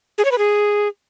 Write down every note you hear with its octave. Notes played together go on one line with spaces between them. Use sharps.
G#4
C#5
B4
G#4